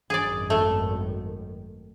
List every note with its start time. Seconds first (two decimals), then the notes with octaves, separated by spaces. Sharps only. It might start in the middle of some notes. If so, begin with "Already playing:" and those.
0.10 G#1 F#2 D#3 G#4 D5
0.50 A3